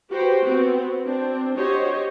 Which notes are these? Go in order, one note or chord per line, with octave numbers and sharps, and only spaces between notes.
F#4 G4 B4 C5 G5
B3 C4 F#4
C4 D4
F#4 G4 C5 C#5 D#5